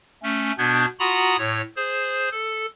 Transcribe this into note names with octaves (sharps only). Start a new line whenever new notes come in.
A3 C#4
B2 B3 D4 G6 G#6
F4 F#4 F#5 A#5 B5 D#6
A2 C#5
G#4 C5
A4